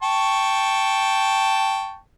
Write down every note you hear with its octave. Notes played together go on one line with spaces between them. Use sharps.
G5 A5 C#6